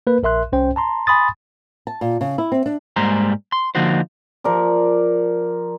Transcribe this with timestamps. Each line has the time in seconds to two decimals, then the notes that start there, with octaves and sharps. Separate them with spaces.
0.07 A#3 A#4 B4
0.23 A#1 A#4 E5 C6 F#6
0.52 C2 C#4 C5 G5
0.76 A5 A#5 C6
1.07 G#5 B5 C6 D#6 A6
1.87 A5
2.01 A#2
2.21 C#3
2.38 E4
2.52 C4
2.66 D4
2.96 G#2 G3 G#3 A#3 C5 A#5
3.52 C6
3.75 D3 F3 A#3 D#4 F#4 C5
4.44 F3 A#4 D5